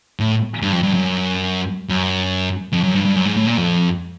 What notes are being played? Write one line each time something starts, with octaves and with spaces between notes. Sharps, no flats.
A2
G2
F2
G2
F#2
F#2
F2
F#2
G2
G2
F#2
G#2
A2
A#2
F2